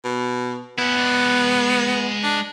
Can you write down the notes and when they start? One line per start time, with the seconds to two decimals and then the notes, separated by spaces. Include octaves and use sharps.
0.05 B2
0.78 B3 C#4 E4
0.97 G#3 D5
2.23 D4